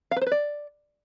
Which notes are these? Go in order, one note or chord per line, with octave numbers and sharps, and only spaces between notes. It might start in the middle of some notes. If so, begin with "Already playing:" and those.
F5
B4
C5
B4
D5